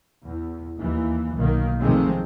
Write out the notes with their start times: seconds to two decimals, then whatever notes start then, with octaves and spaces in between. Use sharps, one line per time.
0.24 E2
0.78 D#2 E3
1.35 B1 D#3 A#3
1.81 F2 C3 D#3 G#3 A3 C4